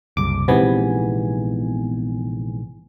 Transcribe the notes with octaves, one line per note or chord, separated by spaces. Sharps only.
F#1 C2 D6
A#1 G#2 C3 E3 B3 G#5